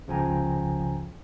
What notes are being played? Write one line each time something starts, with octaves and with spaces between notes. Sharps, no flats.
C#2 C#3 F3 G5 G#5 A#5